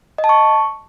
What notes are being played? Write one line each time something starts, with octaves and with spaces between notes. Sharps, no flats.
D#5
A5
C#6